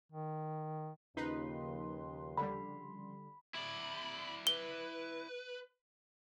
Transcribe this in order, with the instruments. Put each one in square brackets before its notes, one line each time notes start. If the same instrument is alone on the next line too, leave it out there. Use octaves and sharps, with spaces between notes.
[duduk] D#3
[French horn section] D#2 [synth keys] C#3 F3 C6 [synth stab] D#4 B4
[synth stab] D3 G3 [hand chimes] B5
[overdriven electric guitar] E4 D5 [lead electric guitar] B5
[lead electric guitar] B4 [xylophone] G7